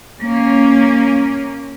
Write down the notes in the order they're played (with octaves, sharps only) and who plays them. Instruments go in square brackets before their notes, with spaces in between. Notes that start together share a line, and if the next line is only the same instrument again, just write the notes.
[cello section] A#3 C#4